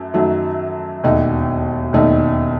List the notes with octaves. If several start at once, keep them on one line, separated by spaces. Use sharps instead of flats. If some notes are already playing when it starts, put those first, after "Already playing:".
Already playing: F#2 A3
F#2 D#3 F#3 A3
E1 D#2 D#3 A3 D#4
E1 D#2 D#3 A3 D#4